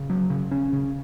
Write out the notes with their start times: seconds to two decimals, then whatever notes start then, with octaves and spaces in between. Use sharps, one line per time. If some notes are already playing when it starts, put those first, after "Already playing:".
Already playing: C#3
0.10 F#3
0.30 C#3
0.51 C#4
0.73 C#3